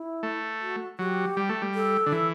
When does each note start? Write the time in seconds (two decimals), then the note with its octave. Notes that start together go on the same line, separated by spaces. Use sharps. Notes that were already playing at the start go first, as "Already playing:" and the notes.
Already playing: E4
0.23 A3
0.61 F#4
0.99 F#3 G4
1.37 G3
1.49 A3
1.62 G3
1.75 A4
2.06 D3
2.12 E3